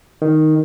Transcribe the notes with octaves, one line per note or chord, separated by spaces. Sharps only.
D#3